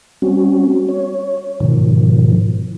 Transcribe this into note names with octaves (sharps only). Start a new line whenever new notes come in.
G3 C4 C#4 F#4
C#5
G#2 B2 D#3 F3